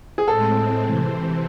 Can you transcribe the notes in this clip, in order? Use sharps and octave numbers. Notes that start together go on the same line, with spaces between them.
G#4
A2 G#3 C4 A4
C3 E3 C4